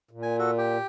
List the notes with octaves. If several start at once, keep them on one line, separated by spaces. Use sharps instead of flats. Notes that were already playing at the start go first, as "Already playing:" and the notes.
A#2
G#5
F#4 A4
G4 G5